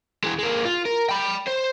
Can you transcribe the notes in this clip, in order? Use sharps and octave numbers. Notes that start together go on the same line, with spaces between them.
E3 G#3
G#3 A#3
F4
A#4
G5 B5
C5